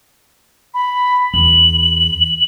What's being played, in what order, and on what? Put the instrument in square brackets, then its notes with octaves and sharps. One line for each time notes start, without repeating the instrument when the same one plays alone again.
[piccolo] B5
[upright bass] E2 [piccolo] F#7